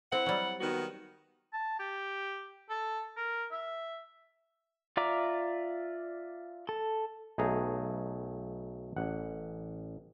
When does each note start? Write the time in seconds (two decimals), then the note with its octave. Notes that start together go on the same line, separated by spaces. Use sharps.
0.12 C4 E4 F#5
0.26 F#3 G3
0.60 D#3 B3 F#4
1.53 A5
1.79 G4
2.70 A4
3.17 A#4
3.52 E5
4.97 F4 D5 E5 A#5 D6
6.69 A4
7.38 B1 A3 G#4 A#5
8.96 A1 F#5